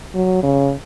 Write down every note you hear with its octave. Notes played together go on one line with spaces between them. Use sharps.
F#3
C#3